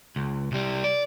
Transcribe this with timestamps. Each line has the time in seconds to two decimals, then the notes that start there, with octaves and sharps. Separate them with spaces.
0.16 C#2
0.52 C2 G3
0.84 D5